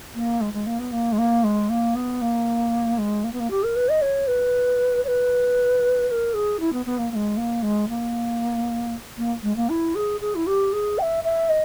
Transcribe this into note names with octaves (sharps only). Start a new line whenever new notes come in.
A#3
G#3
G#3
A#3
B3
A#3
G#3
A#3
G#3
A#3
B3
A#3
G#3
A#3
B3
A#3
G4
A#4
B4
D#5
C#5
B4
C#5
B4
B4
A#4
G#4
E4
B3
B3
A#3
A#3
G#3
A#3
G#3
A#3
A#3
G#3
A#3
E4
G#4
G#4
E4
G4
G#4
G5
E5
E5
D#5